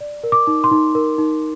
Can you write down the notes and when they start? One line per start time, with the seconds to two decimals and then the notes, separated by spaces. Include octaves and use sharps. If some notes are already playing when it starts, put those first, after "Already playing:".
0.01 D5
0.24 A#4
0.32 D6
0.47 D#4
0.64 C6
0.71 D#4
0.95 A#4
1.18 D#4